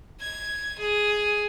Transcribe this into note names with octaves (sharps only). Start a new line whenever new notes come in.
G#6
G#4